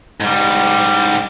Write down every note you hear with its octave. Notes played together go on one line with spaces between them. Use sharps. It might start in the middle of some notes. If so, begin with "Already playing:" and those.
G#2 G3